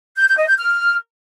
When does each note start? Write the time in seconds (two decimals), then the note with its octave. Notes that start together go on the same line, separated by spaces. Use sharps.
0.17 G6
0.27 G6
0.37 D#5
0.47 G6
0.58 F6